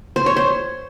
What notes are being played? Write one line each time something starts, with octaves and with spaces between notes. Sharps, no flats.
C5
C#5
C5